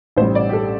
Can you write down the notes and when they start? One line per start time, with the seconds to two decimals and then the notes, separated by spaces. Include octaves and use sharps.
0.17 A1 A2 G3 C5
0.35 D5
0.49 G4
0.53 A4